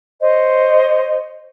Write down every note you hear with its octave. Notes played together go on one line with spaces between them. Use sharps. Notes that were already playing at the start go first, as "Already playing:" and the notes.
C5 C#5 D#5